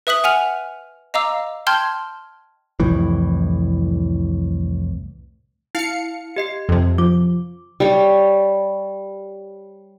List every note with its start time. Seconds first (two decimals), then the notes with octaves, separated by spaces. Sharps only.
0.07 B4 E5 D#6 F#6 B6 F#7
0.24 F#5 G#5 F6 F7
1.14 D#5 F5 A#5 D6 E6
1.67 G5 A5 C6 F6 G6 G#6
2.80 C2 F2 A2 E3
5.75 E4 F5 C#7
6.36 G4 D#5 C7
6.69 F2 C3
6.98 F3 D6
7.80 G3 C#5